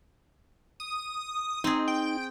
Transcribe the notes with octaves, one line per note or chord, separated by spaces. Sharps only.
D#6
C4 D#4 G#4
G5